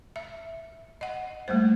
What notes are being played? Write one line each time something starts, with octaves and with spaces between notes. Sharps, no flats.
E5
D#5 F#5
G3 A3 A#3 C5